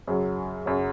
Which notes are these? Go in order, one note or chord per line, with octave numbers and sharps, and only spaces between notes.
F#2 C#3 F#3
F#2 C#3 F#3